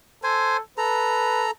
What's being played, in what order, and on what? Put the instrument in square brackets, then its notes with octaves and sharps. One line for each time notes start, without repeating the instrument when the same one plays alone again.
[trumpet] A4 [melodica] C5 G#5
[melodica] A4 A#5 [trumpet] B4